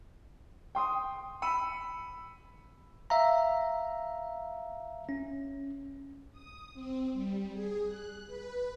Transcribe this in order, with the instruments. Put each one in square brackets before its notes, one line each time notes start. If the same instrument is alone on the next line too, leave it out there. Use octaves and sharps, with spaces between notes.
[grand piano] G5 C6 D#6
B5 E6 C#7 D#7
[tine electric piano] E5 F5 A#5
C#4
[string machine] D#6
C4
G3
G#4
F#6
B4